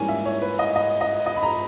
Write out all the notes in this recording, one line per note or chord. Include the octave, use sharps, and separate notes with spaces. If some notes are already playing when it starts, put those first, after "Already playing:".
Already playing: G#2 E3 G3 A#3 C#4 C#5 G#5
E5
C#5
B4
D#5
D#5
D#5
D#5
B5
A#5